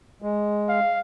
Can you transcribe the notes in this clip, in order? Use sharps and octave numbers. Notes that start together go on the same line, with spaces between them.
G#3
F5